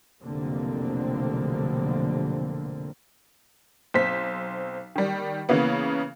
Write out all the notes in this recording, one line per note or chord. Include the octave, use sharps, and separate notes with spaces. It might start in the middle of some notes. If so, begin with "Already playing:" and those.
F1 B1 D3 A#3 C4
B1 C4 C5 B6
D#3 G3
C#3 E3 A#3 B3